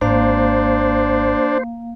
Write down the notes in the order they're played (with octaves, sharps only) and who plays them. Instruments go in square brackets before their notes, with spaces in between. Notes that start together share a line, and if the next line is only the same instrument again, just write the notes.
[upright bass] G#1 [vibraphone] A#3 F5 [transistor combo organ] D4 [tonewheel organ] C5